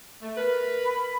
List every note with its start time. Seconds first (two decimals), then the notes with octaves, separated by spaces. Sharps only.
0.22 A3
0.37 A#4 B4
0.85 B5